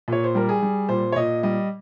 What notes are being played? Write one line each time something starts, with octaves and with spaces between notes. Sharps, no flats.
A#2 C#5
C5
G3 A#4
G#4
G3
A#2 C5
C#5
A#2 D#5
G3 D#5